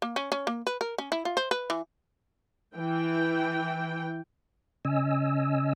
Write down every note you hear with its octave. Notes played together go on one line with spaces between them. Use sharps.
A#3
C#4
C#4
A#3
B4
A#4
C#4
E4
F4
C5
B4
E3
E3 G5
C#3 C#4 D#5 G#5 E6